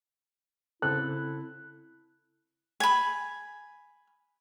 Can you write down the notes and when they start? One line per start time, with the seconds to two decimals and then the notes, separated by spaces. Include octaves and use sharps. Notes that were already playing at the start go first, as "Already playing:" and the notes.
0.82 C#3 C4 E4 A4 F#6
2.80 G#5 B5